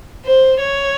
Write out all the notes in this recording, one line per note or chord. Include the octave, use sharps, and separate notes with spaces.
C5
C#5